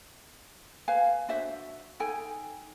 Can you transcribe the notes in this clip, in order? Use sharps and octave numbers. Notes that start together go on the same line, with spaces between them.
B4 F5 G#5
D4 F#4 C5 E5
D#4 A4 G5 G#5